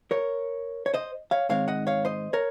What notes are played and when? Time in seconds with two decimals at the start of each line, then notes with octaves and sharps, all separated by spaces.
0.11 A#4 C#5
0.86 C#5
0.94 C5 D#5
1.31 C#5 F5
1.49 G#2 D#3 G#3 C4 C#5 F5
1.68 D#5 F#5
1.87 C#5 F5
2.05 C5 D#5
2.33 A#4 C#5